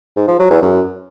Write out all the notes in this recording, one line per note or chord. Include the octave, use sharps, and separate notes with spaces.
G#2
F3
F#3
E2
F#2